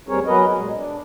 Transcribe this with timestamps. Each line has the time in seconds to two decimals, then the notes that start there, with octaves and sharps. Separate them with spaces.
0.09 D#2 G3 C4 G#4 A#4 C#5
0.26 F#3 B3 G#4 A#4 B4 D#5
0.57 A#2 G#3
0.75 D4